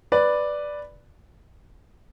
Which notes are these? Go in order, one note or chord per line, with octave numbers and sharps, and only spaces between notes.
B4 D5